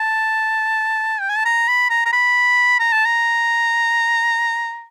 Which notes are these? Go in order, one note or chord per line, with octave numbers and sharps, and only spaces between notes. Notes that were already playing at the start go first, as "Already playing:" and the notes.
Already playing: A5
G5
G#5
A5
A#5
B5
A#5
A#5
B5
A#5
A5
A#5